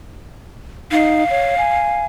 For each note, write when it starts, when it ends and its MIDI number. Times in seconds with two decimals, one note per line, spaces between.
0.91 1.24 63
0.91 2.06 77
1.30 1.58 73
1.58 2.05 80